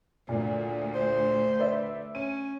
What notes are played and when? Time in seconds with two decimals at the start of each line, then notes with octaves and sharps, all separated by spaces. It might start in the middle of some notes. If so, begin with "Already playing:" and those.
0.29 D2 A#2
0.95 C5
1.59 B4 D5 E5
2.15 C#4 D#7